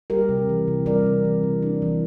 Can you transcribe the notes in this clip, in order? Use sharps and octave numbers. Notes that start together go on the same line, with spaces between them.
G3 G4 A#4
C3
E3
C3
G3 A#4 D5
C3
E3
C3
D4
E3